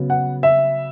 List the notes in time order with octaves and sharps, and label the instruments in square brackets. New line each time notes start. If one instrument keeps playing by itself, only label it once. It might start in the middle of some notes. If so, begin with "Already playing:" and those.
Already playing: [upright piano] C#3 F#3 B3
F#5
E5